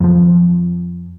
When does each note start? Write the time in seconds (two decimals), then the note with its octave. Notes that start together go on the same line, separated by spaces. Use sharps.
0.01 F2 F3